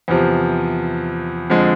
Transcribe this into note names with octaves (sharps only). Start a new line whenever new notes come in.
E2 C3 F3
F2 D3 F3 G#3